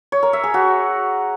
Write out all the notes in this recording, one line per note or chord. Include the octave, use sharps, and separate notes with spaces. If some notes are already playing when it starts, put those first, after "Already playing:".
C#5
A#4
E5
G#4
F#4